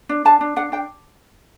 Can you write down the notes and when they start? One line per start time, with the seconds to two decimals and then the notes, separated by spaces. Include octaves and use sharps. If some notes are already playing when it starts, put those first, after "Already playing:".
0.09 D4
0.25 D4 A5
0.41 D4
0.56 D4 F#5
0.72 D4 G5